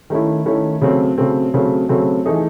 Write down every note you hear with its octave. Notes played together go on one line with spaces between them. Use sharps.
D#3 A3 C#4 E4
D#3 A3 C#4 E4
C#3 F#3 A3 C4
C#3 F#3 A3 C4
C#3 F#3 A3 C4
C#3 F#3 A3 C4
E3 A3 D#4 G#4